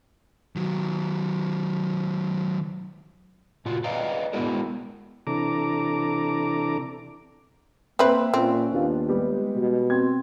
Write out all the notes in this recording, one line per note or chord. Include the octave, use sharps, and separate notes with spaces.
D#3 F#3
A#2 F4 F#4
B4 D5 D#5 F5 G5 A#5
G#3 B3 E4 F#4 A#4
C3 E3 D4 A4 A#5 D6
A#3 C4 B4 E5 C6 F#6
A#2 C4 C#4
D#2 B3 D4 F4
G3 G#3 B3 G4
B2
C4 G#6